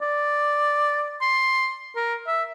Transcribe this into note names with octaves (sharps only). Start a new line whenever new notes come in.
D5
C6
A#4
E5